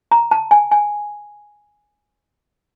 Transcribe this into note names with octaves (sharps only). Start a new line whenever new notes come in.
A#5
A5
G#5
G#5